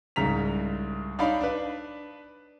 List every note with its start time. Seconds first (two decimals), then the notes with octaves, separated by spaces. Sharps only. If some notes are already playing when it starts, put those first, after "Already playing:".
0.16 C2 G#2 C#3 A#5 B6 F7
1.19 D4 D#4 C#5 D5 F5 B5
1.41 D4 B4